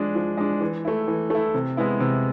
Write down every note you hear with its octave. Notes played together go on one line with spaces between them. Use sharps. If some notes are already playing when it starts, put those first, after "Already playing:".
Already playing: F3 G#3 D4
F3
G#3 D4
E3
A3 E4
E3
A3 E4
C3
G#3 B3 E4
C3